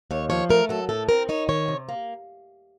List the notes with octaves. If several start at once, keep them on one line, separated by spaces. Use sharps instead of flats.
D#2 C#5
F3 C#5
A3 A#4
F#3 A4
A2 A4
C4 A#4
D#4 C#5
D#3 C#5
C3
A#3